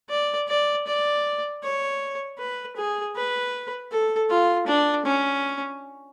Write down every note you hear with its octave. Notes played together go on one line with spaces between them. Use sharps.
D5
D5
D5
C#5
B4
G#4
B4
A4
F4
D4
C#4